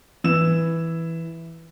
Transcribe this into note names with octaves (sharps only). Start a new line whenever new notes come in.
E3 E6 E7